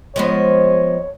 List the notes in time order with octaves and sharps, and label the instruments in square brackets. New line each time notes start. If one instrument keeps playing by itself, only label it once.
[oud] F3 G#3 B3 [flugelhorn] C#5